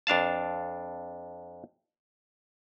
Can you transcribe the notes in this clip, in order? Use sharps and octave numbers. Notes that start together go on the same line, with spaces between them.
F2 D4 F5 A5